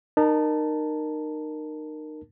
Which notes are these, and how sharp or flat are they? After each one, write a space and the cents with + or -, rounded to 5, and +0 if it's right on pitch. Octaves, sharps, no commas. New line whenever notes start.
D#4 -30 A#4 +0 A5 +0